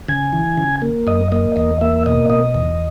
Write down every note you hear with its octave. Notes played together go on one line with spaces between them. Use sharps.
C#3 G#5
E3
C#3
A#3
F#2 D#5
A#3 D#5
E2 D#5
A#3 E5
B2 D#5
B2 D#5
E2